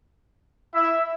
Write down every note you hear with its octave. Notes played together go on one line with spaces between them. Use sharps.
E4 E5